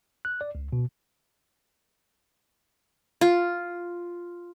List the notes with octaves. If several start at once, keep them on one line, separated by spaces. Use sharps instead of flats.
F#6
D5
C#2
B2
F4